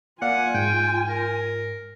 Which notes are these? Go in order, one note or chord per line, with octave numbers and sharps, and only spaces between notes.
A#3 F4 D5 F5 F#5 G#5
G#2 G5
A#4